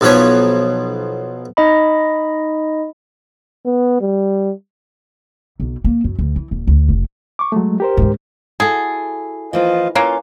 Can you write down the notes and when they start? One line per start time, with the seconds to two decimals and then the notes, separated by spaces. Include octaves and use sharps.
0.01 B1 B2 F3 B4 C#5
1.57 D#4 D#5 B5
3.65 B3
4.01 G3
5.60 B1
5.84 A#3
6.04 F#2
6.19 D2
6.36 E3
6.51 D#1
6.67 D2
6.89 F1
7.39 C#6 D6
7.52 F#3 G#3 A3
7.80 G4 A#4 C5
7.97 G#2 D3
8.60 E4 F#4 G#4 A4
9.53 E3 F3 A#3 F4 D#5 F5
9.95 E3 A#3 C#4 F4 F5